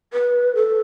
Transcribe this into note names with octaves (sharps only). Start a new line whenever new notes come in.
B4
A4